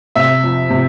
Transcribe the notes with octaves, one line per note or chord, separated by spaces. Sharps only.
C3 E5
F2
C3